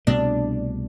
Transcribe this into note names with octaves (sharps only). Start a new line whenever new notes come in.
C2 B2 A3 D4